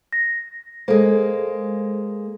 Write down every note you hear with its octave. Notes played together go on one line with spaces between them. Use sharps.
A#6
G#3 A#3 A4 C5